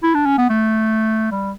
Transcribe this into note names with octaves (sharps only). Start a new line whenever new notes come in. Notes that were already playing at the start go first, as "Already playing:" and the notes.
E4
D4
C#4
B3
A3
G3